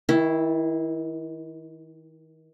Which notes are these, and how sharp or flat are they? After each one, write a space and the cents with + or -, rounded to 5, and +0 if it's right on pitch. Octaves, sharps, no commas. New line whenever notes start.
D#3 +35 E4 +0